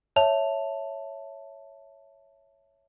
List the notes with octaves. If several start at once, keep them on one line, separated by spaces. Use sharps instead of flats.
C#5 E5 A5 F7